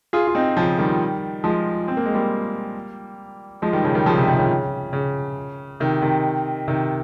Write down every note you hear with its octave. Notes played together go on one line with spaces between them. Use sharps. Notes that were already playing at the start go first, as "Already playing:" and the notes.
F4 G#4
F4
C4 D#4
C#3 F3
D#3 G3
F3 G#3
C4
A#3
G#3
G3 A#3
F3 G#3
D#3 G3
C#3 F3
D#3 G3
C#3 F3
C3 D#3
C3 D#3
C#3
C#3
C3 D#3
C3 D#3
C3 D#3